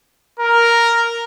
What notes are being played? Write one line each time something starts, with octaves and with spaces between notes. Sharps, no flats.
A#4